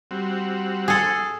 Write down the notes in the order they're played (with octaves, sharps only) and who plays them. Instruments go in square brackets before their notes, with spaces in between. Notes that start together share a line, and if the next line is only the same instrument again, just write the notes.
[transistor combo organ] G3 C4 F#4
[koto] G#4 A4